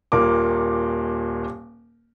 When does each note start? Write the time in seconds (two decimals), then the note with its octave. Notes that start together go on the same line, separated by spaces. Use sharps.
0.12 D#1 A#2 A#3 D6